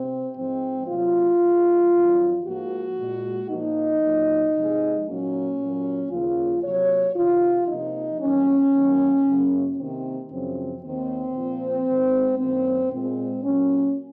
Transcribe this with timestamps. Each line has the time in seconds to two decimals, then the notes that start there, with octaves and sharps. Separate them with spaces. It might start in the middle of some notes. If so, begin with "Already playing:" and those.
Already playing: C3 C4
0.35 G#2 F3 G#3 C4
0.87 C3 F#3 A#3 F4
1.39 G#2 F3 G#3
1.93 F2 D#3 F#3
2.44 G#2 F3 A#3 F#4
2.96 A#2 G#3
3.49 A#2 F3 A#3 D#4
4.01 A#2 F#3 A#3
4.54 C3 F3 G#3
5.06 A#2 F#3 A#3 C#4
5.58 A#2 F#3 A#3
6.10 D#2 C#3 F3 A#3 F4
6.63 C3 F#3 A#3 C#5
7.15 F2 C3 D#3 F4
7.67 C3 F3 A#3 D#4
8.20 F2 D#3 F#3 A#3 C#4
8.72 D#2 D#3 F#3 A#3
9.24 F#2 C#3 F#3 A#3
9.77 C3 D#3 A#3 C4
10.29 F#2 C#3 F3 C4
10.81 D#2 D#3 A#3 C4
11.34 A#2 F3 A#3
11.87 G#2 D#3 G#3
12.38 F#2 D#3 F#3 A#3 C4
12.91 A#2 G#3 C4
13.43 A#2 F#3 A#3 C#4